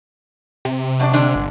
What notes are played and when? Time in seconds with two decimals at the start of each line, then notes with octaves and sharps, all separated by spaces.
0.65 C3
1.00 F#2 D4 D5
1.14 D3 G#3 D4
1.36 G1